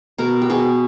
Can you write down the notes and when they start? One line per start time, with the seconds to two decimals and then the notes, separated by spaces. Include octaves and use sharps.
0.18 B2 A#4
0.42 G4
0.50 B2 G#4